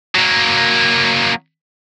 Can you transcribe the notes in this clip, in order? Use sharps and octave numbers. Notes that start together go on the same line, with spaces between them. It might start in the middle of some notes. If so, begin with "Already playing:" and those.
F#3 A#3